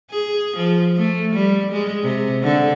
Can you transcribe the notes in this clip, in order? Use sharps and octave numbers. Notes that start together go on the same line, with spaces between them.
G#4
F3
A3
G3
G#3
C3
D3